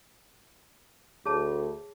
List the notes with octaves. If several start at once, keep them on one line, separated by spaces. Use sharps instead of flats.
D2 G#4 C#5 A5